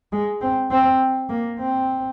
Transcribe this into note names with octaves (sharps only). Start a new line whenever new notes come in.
G#3
C4
C4
A#3
C4